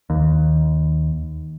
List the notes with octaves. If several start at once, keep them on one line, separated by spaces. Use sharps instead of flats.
D#2